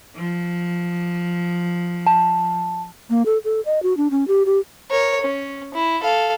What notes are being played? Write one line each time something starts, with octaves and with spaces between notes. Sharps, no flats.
F3
A5
A#3
A4
A4
D#5
F#4
D4
C#4
G4
G4
A#4 C#5
C#4
E4
A4 F5